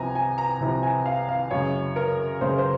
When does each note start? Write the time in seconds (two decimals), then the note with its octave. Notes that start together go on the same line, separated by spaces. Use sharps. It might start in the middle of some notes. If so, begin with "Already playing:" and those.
Already playing: C2 C3 F3 G#5 A#5
0.15 G#5
0.38 A#5
0.60 C2 C3 F3
0.83 G#5
1.06 F5
1.28 F5
1.51 F#2 C#3 G#3 C#5
1.96 A#4
2.41 F#2 C#3 G#3 C5
2.58 C5